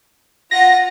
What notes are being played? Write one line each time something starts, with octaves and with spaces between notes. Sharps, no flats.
F4 F#5 A#6